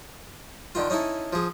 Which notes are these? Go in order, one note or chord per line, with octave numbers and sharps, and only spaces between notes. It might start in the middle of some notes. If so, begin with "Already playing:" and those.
D3 D#3 F4
C#4 D#4 E4 A4
F3 G#4